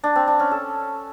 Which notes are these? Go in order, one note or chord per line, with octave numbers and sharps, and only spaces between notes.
D4
C4
D4
C#4
A4